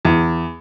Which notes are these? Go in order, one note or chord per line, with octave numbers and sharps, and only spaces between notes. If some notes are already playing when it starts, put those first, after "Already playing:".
E2